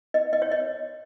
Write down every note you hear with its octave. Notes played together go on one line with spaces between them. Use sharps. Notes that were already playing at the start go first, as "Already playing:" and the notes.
D#5
D#5
C#5
D#5